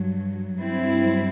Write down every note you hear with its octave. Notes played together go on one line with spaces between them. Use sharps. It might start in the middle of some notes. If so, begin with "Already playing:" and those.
Already playing: G2 F#3
G2 F#3 C4 E4